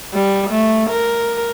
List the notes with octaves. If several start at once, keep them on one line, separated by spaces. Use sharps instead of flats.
G3
A3
A#4